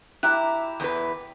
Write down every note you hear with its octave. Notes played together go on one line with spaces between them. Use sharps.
E4 G4 A#5 D6 F#6
E2 E3 B4